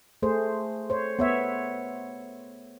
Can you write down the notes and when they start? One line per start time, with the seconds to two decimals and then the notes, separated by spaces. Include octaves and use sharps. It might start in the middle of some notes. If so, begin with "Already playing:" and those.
0.22 A3 G#4 C5
0.90 C5 C#5
1.19 B3 C#5 E5